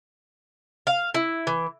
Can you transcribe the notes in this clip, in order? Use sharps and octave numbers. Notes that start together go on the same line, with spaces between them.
F5
E4
E3